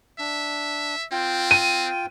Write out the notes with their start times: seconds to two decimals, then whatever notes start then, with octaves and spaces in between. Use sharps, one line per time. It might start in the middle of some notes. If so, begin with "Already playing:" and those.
0.19 D4 E5
1.12 C4 F4 G5
1.51 D#7